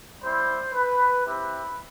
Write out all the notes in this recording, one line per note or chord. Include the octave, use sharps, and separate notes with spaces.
G3 C4 E4 C5
B4
C4 E4 G4 B4